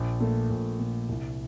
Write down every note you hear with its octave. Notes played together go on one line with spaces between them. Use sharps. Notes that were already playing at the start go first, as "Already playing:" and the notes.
Already playing: A#1
A#2 A3
A#1
A#2 A3
C2